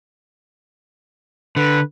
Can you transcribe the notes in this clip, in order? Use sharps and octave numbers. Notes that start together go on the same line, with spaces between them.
D3 B4